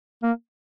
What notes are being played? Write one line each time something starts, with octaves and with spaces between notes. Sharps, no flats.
A#3